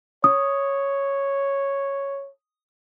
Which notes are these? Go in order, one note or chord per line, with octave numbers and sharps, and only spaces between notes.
C#5 D#6